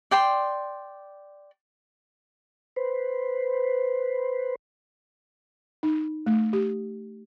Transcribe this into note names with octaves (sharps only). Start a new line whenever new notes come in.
D5 G5 C6
B4 C5
D#4
A3
G4